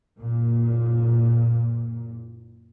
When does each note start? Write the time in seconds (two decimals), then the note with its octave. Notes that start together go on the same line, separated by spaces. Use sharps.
0.18 F#1 A#2